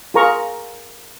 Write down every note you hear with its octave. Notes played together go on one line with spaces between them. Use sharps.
F4 G#4 A#4 A#5 C#6